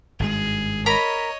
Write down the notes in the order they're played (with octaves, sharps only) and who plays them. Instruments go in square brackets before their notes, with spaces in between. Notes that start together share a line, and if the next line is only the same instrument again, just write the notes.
[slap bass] G#1 G2 G#3 [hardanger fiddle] G#4
[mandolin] A#4 A#5 B5 [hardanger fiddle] C#5 D#5